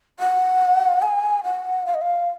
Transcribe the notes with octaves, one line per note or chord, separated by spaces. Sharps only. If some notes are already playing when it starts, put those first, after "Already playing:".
F#5
G#5
F#5
F5
D#5
F5